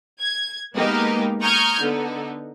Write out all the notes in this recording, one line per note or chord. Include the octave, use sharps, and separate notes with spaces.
G#6
G#3 A#3 B3 D#4 G4
A#5 C#6 D#6 F6 G6 G#6
D3 B3 D#4